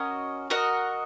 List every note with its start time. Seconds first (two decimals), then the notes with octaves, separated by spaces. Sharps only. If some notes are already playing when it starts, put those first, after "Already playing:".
Already playing: C#4 F#4 A#4 D#5
0.50 F#4 A#4 D#5 F#5